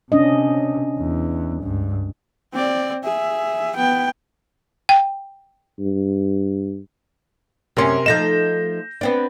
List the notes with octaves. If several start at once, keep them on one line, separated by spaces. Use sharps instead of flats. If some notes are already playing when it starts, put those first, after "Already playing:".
C3 C#4 D4 D#5
E2
C#2 G2
C4 D5
G#4 E5
B3 G5
G5
G2
F#2 C3 C#4 A#4 C6
F3 A3 D#4 G6 A#6 E7
B3 C4 D4